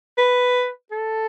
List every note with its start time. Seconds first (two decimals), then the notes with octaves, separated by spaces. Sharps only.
0.18 B4
0.91 A4